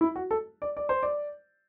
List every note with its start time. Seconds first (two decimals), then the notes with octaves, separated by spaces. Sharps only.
0.01 E4
0.16 F#4
0.31 A4
0.62 D5
0.77 D5
0.89 C5
1.03 D5